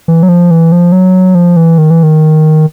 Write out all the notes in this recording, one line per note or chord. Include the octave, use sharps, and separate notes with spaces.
E3
F#3
F3
E3
F3
F#3
F3
E3
D#3
E3
D#3